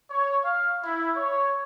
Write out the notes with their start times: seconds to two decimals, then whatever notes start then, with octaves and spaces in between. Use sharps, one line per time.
0.10 C#5
0.45 F5
0.84 E4
1.15 C#5